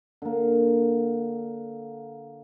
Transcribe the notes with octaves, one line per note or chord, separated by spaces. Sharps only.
D3 A#3